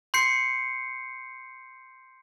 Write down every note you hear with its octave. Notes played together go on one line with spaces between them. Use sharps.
C6 G6 C7 C#7